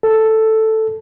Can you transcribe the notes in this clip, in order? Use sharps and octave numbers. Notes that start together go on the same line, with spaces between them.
A4